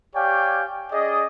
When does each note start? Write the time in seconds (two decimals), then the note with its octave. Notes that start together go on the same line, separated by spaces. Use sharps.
0.15 G4 C#5 D5 F5 G5 G#5
0.92 C#4 G#4 D5 D#5